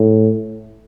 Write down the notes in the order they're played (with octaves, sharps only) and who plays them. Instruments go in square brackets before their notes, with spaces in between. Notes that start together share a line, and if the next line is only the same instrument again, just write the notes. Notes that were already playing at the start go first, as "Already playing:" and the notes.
Already playing: [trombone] A2